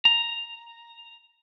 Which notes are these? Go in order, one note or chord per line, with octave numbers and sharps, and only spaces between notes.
A#5